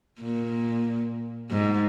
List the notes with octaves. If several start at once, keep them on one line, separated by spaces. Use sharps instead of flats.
A#2
G#2